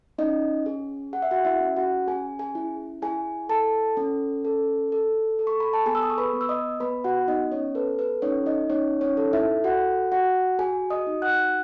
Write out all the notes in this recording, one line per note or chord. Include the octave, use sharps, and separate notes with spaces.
C#4 D#4 D#5
G#4
G#4 F#5
E5
F#4 F#5
E4 E5
C#4
F#4 F#5
C#4 G#4 G#5
G#4 G#5
E4
E4 G#4 G#5
A4 A5
C#4
A4
A4
A4
C#6
B5
A5
B3 G#4 G#5
E6
D#6
C#6
B4 B5
B3
E6
D#5 D#6
B3 B4 B5
F#4 F#5
B3 D#4 D#5
C#4 C#5
A4 B4
B4
C#4 D#4 C#5
D#4 D#5
C#4 D#4 C#5
C#4 C#5
A4
E4 E5
F#4 F#5
F#4 F#5
F#4 G#4 G#5
D#5 D#6
D#4
F#5 F#6